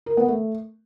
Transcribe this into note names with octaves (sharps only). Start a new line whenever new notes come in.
A#4
B3
A3